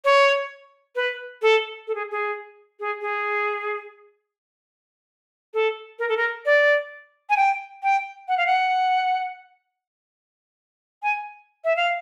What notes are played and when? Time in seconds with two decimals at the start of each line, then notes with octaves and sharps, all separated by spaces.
0.05 C#5
0.96 B4
1.42 A4
1.88 A4
1.95 G#4
2.11 G#4
2.80 G#4
3.01 G#4
5.54 A4
5.99 A#4
6.09 A4
6.17 A#4
6.46 D5
7.30 G#5
7.37 G5
7.83 G5
8.28 F#5
8.38 F5
8.46 F#5
11.03 G#5
11.64 E5
11.76 F5